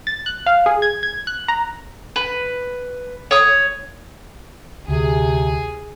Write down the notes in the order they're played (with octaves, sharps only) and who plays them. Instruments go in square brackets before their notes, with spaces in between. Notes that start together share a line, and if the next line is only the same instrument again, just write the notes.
[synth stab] A6
F#6
F5
G#4
G#6
G#6
F#6
A#5
[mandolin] B4
C#5 D#6
[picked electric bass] D2 [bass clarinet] C3 [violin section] G#4